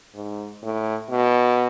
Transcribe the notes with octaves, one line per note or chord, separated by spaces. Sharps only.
G#2
A2
B2